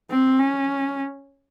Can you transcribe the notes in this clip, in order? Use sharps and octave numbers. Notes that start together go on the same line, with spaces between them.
C4
C#4